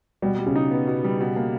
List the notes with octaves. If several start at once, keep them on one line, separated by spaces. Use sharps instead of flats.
B2 G3
G3
C#3
D#4
B3
B2
G3
B2
A#3